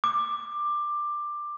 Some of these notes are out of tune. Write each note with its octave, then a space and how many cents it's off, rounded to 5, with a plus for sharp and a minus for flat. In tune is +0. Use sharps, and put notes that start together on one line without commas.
D6 +15